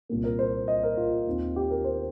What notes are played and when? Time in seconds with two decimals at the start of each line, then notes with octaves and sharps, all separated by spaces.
0.09 C2 A#2 A#3
0.24 A#4
0.39 C5
0.68 D#5
0.83 A#4
0.97 F4
1.27 D#2 D#3 C4
1.56 G4
1.70 A#4
1.84 C5